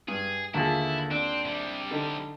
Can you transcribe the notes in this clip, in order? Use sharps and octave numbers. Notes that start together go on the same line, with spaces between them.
G2 G#4
D#2 D3 A3 E4 F4 G#4 A4
C4 D4
C3 G3
D3 D#4 A4